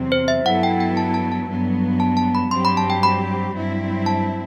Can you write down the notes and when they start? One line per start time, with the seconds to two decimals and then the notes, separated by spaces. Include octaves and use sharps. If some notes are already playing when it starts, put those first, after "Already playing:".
Already playing: E2 C3 F#3 C4
0.12 C5
0.28 E5
0.46 G2 F#3 B3 E4 A4 F#5
0.63 G5
0.80 G5
0.97 A5
1.14 A5
1.32 A5
1.49 G2 F#3 B3
2.00 A5
2.17 A5
2.35 B5
2.51 G2 F#3 C4 G4 C6
2.65 B5
2.77 A5
2.90 G5
3.03 B5
3.55 G2 F#3 C4 E4
4.06 A5